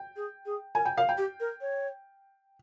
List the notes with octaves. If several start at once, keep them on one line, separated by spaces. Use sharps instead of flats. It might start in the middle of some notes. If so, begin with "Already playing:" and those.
Already playing: G5
G#4
G#4
A#4 G#5
G5
A#4 F5
G5
G4
A#4
C#5